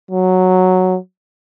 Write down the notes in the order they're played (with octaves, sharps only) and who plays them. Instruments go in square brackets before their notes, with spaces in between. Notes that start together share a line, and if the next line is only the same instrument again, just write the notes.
[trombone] F#3